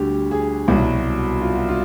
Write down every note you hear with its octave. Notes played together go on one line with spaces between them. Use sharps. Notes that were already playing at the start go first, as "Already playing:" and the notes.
Already playing: D2 D3 G3 F#4 G4
G#4
C2 B2 F#3 F#4
F4
F#4
F4